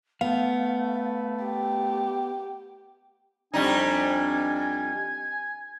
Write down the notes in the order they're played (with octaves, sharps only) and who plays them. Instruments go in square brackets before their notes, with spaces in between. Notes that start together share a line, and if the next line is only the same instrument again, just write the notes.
[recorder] A3 [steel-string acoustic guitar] B3 [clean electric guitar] F5
[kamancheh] G4
[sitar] F2 G3 D#4 [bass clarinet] D4 [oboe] G#5